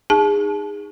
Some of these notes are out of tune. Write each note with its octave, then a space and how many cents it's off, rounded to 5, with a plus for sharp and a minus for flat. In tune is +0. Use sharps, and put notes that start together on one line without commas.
D#4 -10 G#4 -20 A5 -30